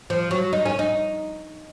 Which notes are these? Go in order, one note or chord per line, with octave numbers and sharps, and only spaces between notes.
F3
F#3
D#4
C#4
D#4